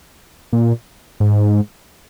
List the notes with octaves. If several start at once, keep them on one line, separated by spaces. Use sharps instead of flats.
A#2
G#2